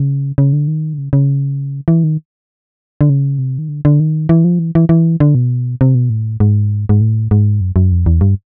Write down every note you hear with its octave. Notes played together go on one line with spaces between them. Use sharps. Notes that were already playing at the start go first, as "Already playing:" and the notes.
Already playing: C#3
C#3
D3
D#3
D3
C#3
C#3
E3
D#3
D3
C#3
C3
D#3
D3
D3
D#3
E3
F3
E3
E3
E3
D3
B2
C3
B2
A2
G#2
G#2
A2
G#2
F#2
F#2
F2
E2
G2